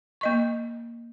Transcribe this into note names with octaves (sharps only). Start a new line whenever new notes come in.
A#3 D#5 C#6